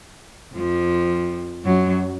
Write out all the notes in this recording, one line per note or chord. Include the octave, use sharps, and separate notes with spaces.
F2 F3
F#2 F#3